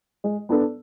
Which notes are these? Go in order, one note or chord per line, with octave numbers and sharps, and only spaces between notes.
G#3
B3 D4 A4